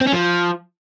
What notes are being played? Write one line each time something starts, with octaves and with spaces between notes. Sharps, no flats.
C4
C#4
F3